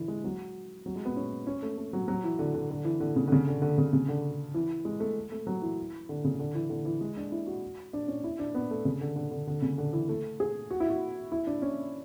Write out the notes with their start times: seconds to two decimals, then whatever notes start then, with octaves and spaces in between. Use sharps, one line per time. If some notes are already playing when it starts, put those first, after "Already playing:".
Already playing: D3 E3
0.08 G#3
0.24 F#3
0.86 F#3
0.96 G#3
1.05 B3
1.16 C#4
1.47 C#4
1.62 A3
1.78 A3
1.93 F#3
2.08 F#3
2.24 E3
2.39 D3
2.54 D3
2.70 D3
2.85 E3
3.00 D3
3.16 C#3
3.27 D3
3.32 C#3
3.47 D3
3.62 D3
3.78 C#3
3.93 C#3
4.08 D3
4.54 E3
4.85 G#3
5.00 A3
5.32 A3
5.47 F#3
5.62 E3
6.09 D3
6.24 C#3
6.39 D3
6.55 E3
6.69 D3
6.85 E3
7.01 G#3
7.17 D4
7.32 E4
7.47 F#4
7.93 D4
8.08 C#4
8.24 E4
8.39 D4
8.55 B3
8.71 A3
8.85 C#3
9.01 D3
9.16 D3
9.31 D3
9.47 D3
9.62 C#3
9.78 D3
9.93 E3
10.09 A3
10.40 G#4
10.70 F#4
10.80 E4
10.90 F#4
11.32 E4
11.47 D4
11.62 C#4